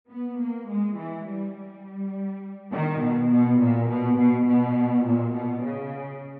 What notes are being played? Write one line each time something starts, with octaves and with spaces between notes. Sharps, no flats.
B3
A#3
G#3
E3
G3
G3
D#3
B2
B2
A#2
B2
B2
B2
A#2
B2
C#3